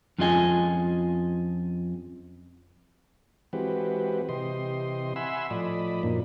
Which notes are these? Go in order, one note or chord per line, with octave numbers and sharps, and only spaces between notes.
F2 C#4 F4 G#4 D#5 G#5
E3 G#3 C4 F#4 G4 B4
C3 E3 G4 D#5 C6
E5 F#5 G#5 B5 C6 E6
A2 F3 D5 D#5 B5
F#2 A#2 F3 A#3 D4 D#4